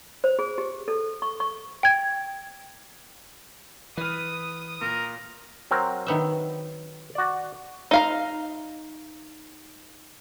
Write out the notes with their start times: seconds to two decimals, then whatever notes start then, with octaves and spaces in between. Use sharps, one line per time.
0.24 C5
0.39 G#4
0.58 G4
0.88 A4
1.22 C#6
1.40 C#6
1.83 G5 G#6
3.97 E3 B4 D#6 F6
4.82 A#2 A#4
5.71 F#3 C4 A#4
6.06 D#3 B3 E5
7.15 F#4 D5
7.91 D#4 F5 A#5